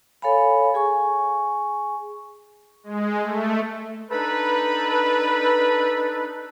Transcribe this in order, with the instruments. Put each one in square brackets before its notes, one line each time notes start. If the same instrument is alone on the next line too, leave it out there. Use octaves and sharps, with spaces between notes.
[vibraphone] A4 C#5 F5 G#5 B5
G#4 G#5 C#6
[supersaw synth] G#3
A3
[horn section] D4 D#4 A4 B4